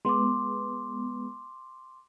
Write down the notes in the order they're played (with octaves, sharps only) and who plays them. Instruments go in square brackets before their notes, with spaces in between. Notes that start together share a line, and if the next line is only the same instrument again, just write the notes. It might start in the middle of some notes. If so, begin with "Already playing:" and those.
[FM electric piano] G#3 B3 [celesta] C6 D6